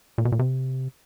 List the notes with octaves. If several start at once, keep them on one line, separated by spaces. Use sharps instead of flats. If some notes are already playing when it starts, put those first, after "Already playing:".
A#2
B2
A#2
C3